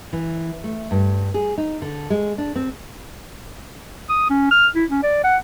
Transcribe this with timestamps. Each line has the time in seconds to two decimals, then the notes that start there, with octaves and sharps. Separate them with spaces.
0.13 E3
0.64 A3
0.91 G2
1.34 G#4
1.58 D#4
1.82 D3
2.10 G#3
2.38 D4
2.56 C4
4.09 D#6
4.30 C#4
4.51 F6
4.75 E4
4.90 C#4
5.03 D5
5.24 F#5